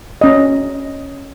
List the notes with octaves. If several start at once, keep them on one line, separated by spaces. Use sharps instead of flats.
C#4 D#5